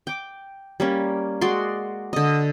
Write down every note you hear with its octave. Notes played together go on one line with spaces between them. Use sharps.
G5 D6
G3 A#3 C#4
G#3 F#4 D5 C6
D3 D#5